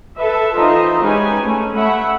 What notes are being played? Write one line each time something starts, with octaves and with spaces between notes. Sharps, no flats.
A4 B4 E5
E3 D#4 F4 C5 D#5 E5
G#3 C#4 D#4 G4 B4 G#5
A3 C#4
A3 E5 F#5 B5